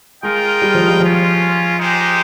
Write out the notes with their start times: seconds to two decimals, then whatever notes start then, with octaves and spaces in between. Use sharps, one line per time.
0.23 G#3 F4 A#4 D#5 G5
0.62 G3
0.75 F3
0.88 G3
1.00 F3 G#3 C#4 F4
1.78 G#3 D#4 G4 C5